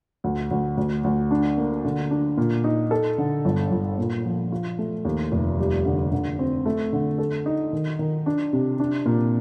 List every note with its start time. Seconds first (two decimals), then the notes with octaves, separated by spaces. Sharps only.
0.24 D2
0.51 D2
0.77 D2
1.04 D2
1.31 D4
1.58 A#3
1.84 D3
2.11 D4
2.37 A#2
2.64 D#4
2.91 A4
3.18 D3
3.45 G1
3.71 G1
3.98 A#2
4.25 F3
4.52 F4
4.79 A3
5.05 D#2
5.32 F1
5.59 G3
5.85 D3
6.12 D3
6.39 C4
6.66 A3
6.93 D3
7.18 A4
7.46 D#4
7.73 D#3
7.99 D#3
8.26 D4
8.53 C3
8.80 D4
9.06 A#2